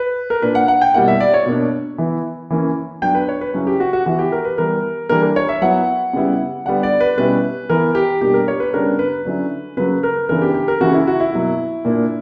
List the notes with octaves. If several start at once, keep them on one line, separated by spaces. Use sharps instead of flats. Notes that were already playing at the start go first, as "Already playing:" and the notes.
Already playing: B4
A#4
A#2 A#3 D4 B4
F#5
F#5
G5
B2 G3 A#3 E4 F#5
E5
D5
C#5
B2 A#3 D4
E3 B3 E4
E3 A#3 C#4 E4
F#3 B3 D4 G5
B4
C#5
B4
C#3 F#3 C#4 E4
G4
F#4
F#4
E3 B3 E4 F#4
G4
A#4
B4
E3 G3 B3 A#4
E3 G3 A#3 D4 A#4
A#4
C#5
E5
F#3 B3 E4 F#5
C#3 G3 B3 E4
D3 G3 B3 F#5
D5
B4
B2 G3 C#4 E4 B4
E3 B3 E4 A#4
G4
B2 G3 A#3 D4 G4
A#4
C#5
B4
C#3 G3 B3 D4 A#4
B4
D3 F#3 C#4 E4
C#3 F#3 A#3 B4
A#4
C#3 E3 B3 D4 A#4
G4
G4
A#4
C#3 E3 A#3 E4 F#4
E4
F#4
E4
B2 F#3 A#3
A#2 A#3 D4